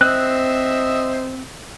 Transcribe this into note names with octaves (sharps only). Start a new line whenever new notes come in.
C4 C5 D#5 E5 F#6